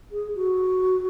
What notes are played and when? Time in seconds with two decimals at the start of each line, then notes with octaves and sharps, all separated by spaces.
0.11 G#4
0.35 F#4